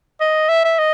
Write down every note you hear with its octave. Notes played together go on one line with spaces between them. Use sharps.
D#5
E5
E5
D#5